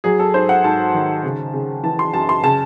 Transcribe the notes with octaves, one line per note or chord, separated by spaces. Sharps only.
F#3 G#4
A4
G#2 C5
F#5
G#2 A5
D#3
C#3
C#3
E3 A5
C6
F#2 A5
C6
C#3 A5